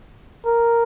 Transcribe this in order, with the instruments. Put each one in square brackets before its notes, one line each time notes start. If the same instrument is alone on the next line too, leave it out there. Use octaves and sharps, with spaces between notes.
[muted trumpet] A#4